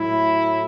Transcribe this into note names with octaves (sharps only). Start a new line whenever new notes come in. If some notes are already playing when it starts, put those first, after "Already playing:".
Already playing: A2 F#3 E4